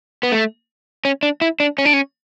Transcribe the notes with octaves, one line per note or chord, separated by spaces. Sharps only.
B3
A3
C#4
D4
E4
D4
C#4
D4
C#4